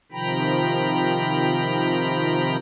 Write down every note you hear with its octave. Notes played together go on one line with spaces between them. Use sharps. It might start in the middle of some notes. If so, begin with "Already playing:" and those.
C3 D#3 F3 G5 A#5 B5